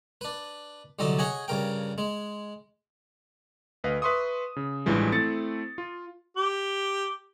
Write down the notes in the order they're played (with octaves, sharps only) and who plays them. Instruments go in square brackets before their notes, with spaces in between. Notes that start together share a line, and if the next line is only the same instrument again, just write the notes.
[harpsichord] D4 B4
C2 D3 F#3 D#5 A5
G#4 C#5 D#5 F#5 G#5
G2 C#3 A#4 G5
G#3
[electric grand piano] D2 B4 D#5 F5
B4 E5 C6 C#6 D#6
C#3
A1 G2 E3 F3 G#3
A3 C4 E4 A6 C#7
F4
[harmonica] G4